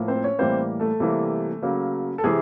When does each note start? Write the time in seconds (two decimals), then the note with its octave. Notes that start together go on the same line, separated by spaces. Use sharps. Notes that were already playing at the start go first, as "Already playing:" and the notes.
Already playing: A2 F3 A#3
0.08 C4 C5
0.24 C#4 C#5
0.38 A2 E3 G3 A#3 C4 C5
0.80 A3 A4
1.00 C3 E3 G3 A#3
1.62 C#3 F#3 A#3
2.18 A4
2.24 C3 E3 G#3 G#4